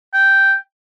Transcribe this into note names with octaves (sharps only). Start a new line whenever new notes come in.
G5